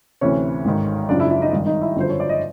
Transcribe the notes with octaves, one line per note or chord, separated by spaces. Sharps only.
D2 C3 E3 C#4 C#5
G#1 G#2 D#3
F#1 F#2 C#3 F3 D4 D5
E4 E5
E4 E5
D#4 D#5
G#1 G2 D#3
D#4 D#5
E4 E5
G1 F#2 D3 F3 C5
C#5
D5
D#5